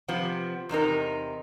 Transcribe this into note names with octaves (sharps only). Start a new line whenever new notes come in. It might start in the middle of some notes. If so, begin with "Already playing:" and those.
C3 F3 B3
E2 C3 D#4 A#4